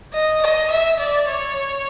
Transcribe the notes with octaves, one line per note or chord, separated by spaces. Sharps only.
D#5
D#5
E5
D5
C#5